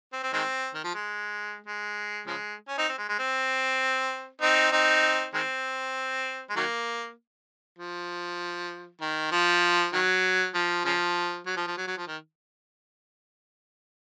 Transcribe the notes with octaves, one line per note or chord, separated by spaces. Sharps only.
C4
C4
D#3 G#3 C4
D#3
F3
G#3
G#3
C#3 F3 G#3
C#4
C4 D#4
C4
G#3
G#3
C4
C4 D#4
C4 D#4
D#3 G#3 C4
G#3
D#3 F#3 A#3
F3
D#3
F3
D#3 F#3
F3
C#3 F3
F#3
F3
F3
F#3
F#3
F3
D#3